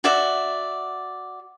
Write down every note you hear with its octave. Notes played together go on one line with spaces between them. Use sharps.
F#4 D5 E5